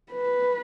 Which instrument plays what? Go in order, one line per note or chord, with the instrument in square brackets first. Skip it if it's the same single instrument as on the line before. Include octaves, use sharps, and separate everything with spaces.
[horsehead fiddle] B4